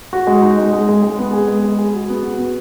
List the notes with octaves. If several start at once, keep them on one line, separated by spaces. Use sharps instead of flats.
F#4
G#3
D#4
G#3
G#3
G#3
G#3
B3
G#4
G#3
G#3
G#4
F#4
B3
F#4
B3